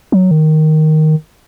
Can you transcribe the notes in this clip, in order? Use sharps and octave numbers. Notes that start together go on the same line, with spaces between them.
F#3
D#3